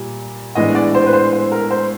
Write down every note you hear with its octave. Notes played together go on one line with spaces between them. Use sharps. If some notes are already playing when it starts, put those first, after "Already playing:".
Already playing: A#2 G3
A2 E3 G#3 B3 D4 D#5
D5
C5
B4
C5
C5
A#4
C5